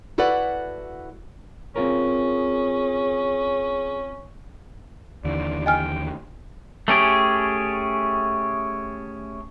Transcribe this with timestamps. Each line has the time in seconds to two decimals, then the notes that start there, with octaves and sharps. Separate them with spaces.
0.18 E4 F#4 A4 B4 D5 F#5
1.76 C4 C#4 F4 G#4 A#4
5.24 D#2 D3 E3 D5
5.66 D#5 G5 G#5 F6
6.88 A3 C#4 G4 G#4